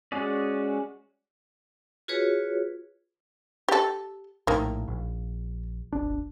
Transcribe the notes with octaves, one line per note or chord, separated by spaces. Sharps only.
G#3 C#4 F#4 G#4 D5
F4 F#4 G#4 B4 C#5
G4 A4
A#1 A2 D#3 A#3
A#1
D#1 G#1 D4